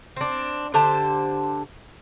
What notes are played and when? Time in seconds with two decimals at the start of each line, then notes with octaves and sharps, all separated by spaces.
0.16 C4 D4
0.74 D3 G4 C5 A5